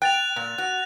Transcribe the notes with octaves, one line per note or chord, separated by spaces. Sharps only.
G5 F#6 A6 F7
A#2
F#4 F#6